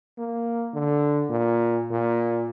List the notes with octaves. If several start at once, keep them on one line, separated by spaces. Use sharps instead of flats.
A#3
D3
A#2
A#2